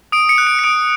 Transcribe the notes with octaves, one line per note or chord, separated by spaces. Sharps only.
D#6 D7
C#7
F#6
D7
C#7
D#6 D7